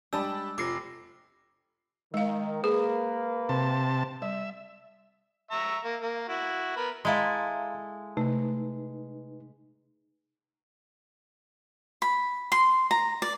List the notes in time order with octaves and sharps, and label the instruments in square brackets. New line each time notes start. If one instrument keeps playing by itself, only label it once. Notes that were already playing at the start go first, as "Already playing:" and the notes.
[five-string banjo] G3 G#3 D4 [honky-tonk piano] G4 A5 B5 [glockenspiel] E6
[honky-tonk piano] F1 F3 C7 [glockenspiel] D6 A#6
[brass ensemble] D#3 [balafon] G#3 F5
[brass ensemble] A#3 B4 [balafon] G#4
[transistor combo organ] C3 A5
[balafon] G3 [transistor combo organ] E5
[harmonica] E5 A#5 C#6
A#3
A#3
E4 F#4
B3 A#4 B5
[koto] G#3 E4 A4 [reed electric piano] F5 A#5 C6
[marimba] C3 A3 [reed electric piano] D#4 B4
[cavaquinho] B5
C6
A#5
D5